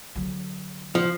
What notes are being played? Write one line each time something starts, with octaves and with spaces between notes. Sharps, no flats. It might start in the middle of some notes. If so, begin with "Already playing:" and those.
D3 F#3
F3